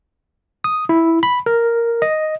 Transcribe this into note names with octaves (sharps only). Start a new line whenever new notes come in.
D#6
E4
B5
A#4
D#5